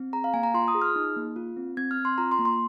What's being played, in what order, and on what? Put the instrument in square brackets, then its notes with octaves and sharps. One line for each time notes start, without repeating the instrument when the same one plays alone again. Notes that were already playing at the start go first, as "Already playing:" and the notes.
Already playing: [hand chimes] C4
G#4 A#5
F5
A#3 G#5
A#5
F4 C6
D#6
G#4
F6
D#4
A#3
F4
C4
C4 G#6
F6
C4
C6
F4 A#5
C6
A#3
C6